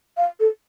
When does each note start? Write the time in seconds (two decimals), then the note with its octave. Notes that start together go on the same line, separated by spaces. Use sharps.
0.17 F5
0.40 A4